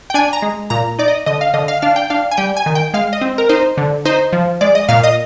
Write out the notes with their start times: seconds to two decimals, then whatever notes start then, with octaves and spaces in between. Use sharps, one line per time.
0.10 G5
0.14 D4 G#5
0.33 A#5
0.42 G#3
0.70 A#2 A#5
0.99 D#4 D5
1.08 D#5
1.26 D3 D#5
1.41 F5
1.54 D3 D#5
1.68 F5
1.82 D4 F5
1.96 G5
2.10 D4 F5
2.31 G#5
2.37 G3 G5
2.57 G#5
2.66 D#3
2.75 G5
2.94 G#3 F5
3.13 D#5
3.21 C4
3.38 A#4
3.49 D#4 C5
3.77 D3
4.05 D#4 C5
4.33 F3
4.61 G#3 D5
4.75 D#5
4.89 A#2 F5
5.03 D#5